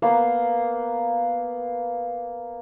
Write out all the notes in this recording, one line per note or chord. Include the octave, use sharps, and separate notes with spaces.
A#3 B3 F5